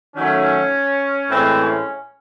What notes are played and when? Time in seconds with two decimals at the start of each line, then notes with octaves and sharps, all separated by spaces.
0.15 D#3 F#3 A3 C#4
1.29 A2 E3 G#3 C4
1.57 C#4